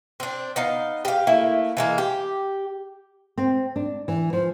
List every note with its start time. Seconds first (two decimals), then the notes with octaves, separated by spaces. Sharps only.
0.20 C4 D4
0.56 B3 D#4 F5
1.05 G4 F5
1.27 A3 A#3 E4
1.77 E3 G#3 A#3
1.98 G4
3.38 C4
3.76 D4
4.08 E3
4.33 F3